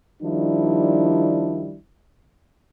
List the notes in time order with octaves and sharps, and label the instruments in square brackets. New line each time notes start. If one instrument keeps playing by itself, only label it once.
[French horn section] D#3 F3 G3 D4 E4